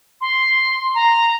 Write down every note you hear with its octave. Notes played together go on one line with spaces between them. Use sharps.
C6
A#5